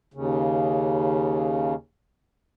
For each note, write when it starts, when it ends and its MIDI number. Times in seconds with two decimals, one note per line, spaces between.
0.14 1.74 39
0.14 1.74 49